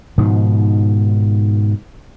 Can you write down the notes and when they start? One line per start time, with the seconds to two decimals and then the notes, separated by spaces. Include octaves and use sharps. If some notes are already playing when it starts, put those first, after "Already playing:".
0.18 G#2 B2 D#3 F3